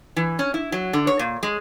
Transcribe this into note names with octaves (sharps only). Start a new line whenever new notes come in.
E3
C#4
E4
F#3
D3
C#5
A#2
G#3